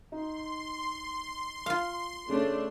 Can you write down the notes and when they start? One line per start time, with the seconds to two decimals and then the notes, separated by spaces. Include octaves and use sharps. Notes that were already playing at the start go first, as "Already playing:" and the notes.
0.12 D#4 C6
1.66 F4 F5
2.29 C#3 A3 C#4 D4